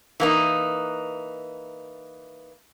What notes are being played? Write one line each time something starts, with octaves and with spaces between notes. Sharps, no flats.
E3 A#3 D#4